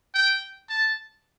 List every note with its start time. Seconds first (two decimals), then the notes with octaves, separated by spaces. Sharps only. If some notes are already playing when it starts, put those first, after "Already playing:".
0.14 G5
0.69 A5